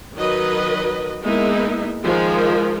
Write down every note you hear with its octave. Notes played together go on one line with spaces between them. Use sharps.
D#3 F#3 B4 D#5
G#3 A#3 B3 D#4 E4 E5
D#3 F3 G#3 F4 A#4